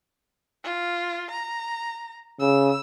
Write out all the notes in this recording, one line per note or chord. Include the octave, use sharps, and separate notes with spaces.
F4
A#5
C#3 E6